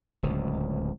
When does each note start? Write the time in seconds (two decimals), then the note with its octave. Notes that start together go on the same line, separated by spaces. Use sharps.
0.23 D1 C#2